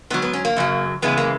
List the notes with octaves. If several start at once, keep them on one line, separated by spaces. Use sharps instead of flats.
G#2 F#3 B3
B3
C#4
A#3
F#2 C#3 F#3
F#2 C#3 E3 G#3 B3
A#3